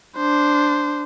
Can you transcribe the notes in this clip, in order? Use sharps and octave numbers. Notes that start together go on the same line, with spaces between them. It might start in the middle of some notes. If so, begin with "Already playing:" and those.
D4 C5